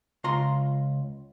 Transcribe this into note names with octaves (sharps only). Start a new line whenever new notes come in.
C#2 F4 A#5 C6